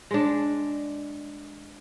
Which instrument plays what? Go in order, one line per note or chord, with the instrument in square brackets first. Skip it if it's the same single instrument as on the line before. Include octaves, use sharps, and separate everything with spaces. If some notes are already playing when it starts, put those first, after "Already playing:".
[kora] G#3 D4